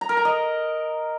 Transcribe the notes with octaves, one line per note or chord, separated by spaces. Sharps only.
A#5
A#4
A#5
D#5